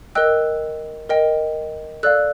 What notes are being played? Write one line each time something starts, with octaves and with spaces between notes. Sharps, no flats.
A#4 D#5 G5 E6 F#6
A#4 D#5 G5
A4 D5 F5 E6 F#6